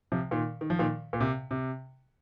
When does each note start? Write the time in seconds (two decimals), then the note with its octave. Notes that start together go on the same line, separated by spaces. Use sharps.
0.12 C3 F3
0.31 A#2 D#3
0.61 D#3
0.70 F3
0.79 A#2 D#3
1.13 A#2
1.20 C3
1.51 C3